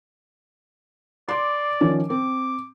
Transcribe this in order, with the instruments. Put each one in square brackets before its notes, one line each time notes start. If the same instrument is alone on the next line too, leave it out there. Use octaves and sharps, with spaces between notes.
[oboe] D5 [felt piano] C6 D6
[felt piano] D#3 F3 C#4
[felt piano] C4 [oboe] D6